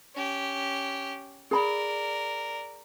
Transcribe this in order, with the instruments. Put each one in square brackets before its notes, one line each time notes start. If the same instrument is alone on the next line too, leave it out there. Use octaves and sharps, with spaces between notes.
[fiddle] C#4 G4
[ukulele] G#4 A#5 B5 [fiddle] A#4 D5